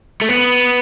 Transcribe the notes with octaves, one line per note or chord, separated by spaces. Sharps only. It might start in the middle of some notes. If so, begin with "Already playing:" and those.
A3
B3